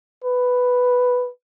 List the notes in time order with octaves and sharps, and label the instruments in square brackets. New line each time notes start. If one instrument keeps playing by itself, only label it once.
[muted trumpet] B4